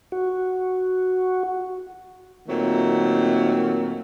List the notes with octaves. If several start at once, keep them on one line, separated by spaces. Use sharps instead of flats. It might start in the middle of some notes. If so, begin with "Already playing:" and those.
F#4
A#2 D#3 F#3 A3 C4